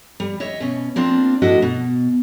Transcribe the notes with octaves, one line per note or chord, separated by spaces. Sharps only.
G3
C#5 D#5 E5
B2 C#4
A#3 C4 D4 F4
A2 D4 E4 F#4 D#5
B2